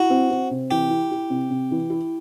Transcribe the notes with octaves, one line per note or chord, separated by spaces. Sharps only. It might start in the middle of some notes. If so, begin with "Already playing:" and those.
Already playing: E4 F#4
C4
C4
C3
E3 G4
E4
E4
C3
C3
E3
E4